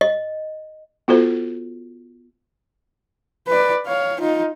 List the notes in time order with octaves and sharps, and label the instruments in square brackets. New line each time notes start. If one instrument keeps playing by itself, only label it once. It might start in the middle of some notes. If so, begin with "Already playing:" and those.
[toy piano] D#5
[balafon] B3 F4 F#4 A4 C5
[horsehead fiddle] B4 D5
C#5 F5
D#4 F4